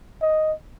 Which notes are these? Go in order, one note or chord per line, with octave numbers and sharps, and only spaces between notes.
D#5